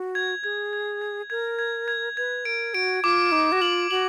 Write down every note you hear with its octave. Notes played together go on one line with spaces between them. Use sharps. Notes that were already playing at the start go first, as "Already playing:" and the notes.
Already playing: F#4
G#6
G#4 G#6
G#6
G#6
A#4 G#6
G#6
G#6
B4 G#6
A#4 D7
F#4 D7
F4 D6
D#4 D6
F#4
F4 F#7
F#4 F#7